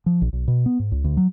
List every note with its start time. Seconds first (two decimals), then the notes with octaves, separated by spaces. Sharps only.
0.06 F3
0.22 A#1
0.33 B1
0.48 B2
0.66 B3
0.79 G#2
0.92 C#2
1.04 D2
1.17 F#3